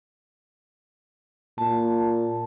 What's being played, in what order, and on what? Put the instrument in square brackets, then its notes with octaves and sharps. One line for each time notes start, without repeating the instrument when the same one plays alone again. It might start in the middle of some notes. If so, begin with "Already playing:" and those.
[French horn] A#2 [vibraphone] A5